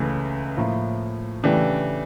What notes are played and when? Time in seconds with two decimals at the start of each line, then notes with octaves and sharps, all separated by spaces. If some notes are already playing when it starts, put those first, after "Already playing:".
Already playing: C#2 C#3 E3 A3
0.57 A2 F3 A#3
1.43 C#3 E3 A3 D4 G4